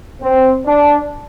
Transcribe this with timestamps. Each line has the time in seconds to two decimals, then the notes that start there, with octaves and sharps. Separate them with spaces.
0.21 C4
0.65 D4